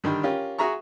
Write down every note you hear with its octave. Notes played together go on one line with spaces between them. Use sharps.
D3 D#3 G3
C#4 F4 G4 A#4
F#4 G#4 E5 A#5 C#6